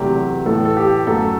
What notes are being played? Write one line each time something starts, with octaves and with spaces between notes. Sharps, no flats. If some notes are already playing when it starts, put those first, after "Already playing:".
Already playing: E2 C3 F#3 A3 G4
A2 E3 A3 A4
A4
G4
F#2 F#3 A3 A4